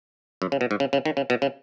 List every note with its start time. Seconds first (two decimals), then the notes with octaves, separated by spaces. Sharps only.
0.42 F#2
0.52 C#3
0.61 B2
0.71 G#2
0.80 C#3
0.93 C#3
1.05 D#3
1.17 C#3
1.30 B2
1.42 C#3